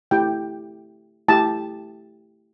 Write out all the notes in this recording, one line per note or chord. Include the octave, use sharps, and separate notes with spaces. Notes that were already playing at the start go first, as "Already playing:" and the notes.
A3 E4 G4 G5
A3 E4 G4 A5